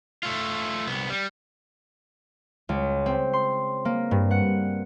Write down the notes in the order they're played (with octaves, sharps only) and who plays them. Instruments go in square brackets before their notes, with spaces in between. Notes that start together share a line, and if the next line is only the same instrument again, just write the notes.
[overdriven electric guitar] A3 F4
C2 B3
G3
[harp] C#2
C4
C6
A#3
G2
F#5